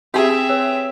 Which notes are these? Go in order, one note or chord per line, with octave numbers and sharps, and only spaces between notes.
C4 G4 G#4 E5
B4 C#5 E6